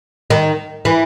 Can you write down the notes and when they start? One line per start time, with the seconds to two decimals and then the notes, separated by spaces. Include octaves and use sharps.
0.30 D#3
0.85 E3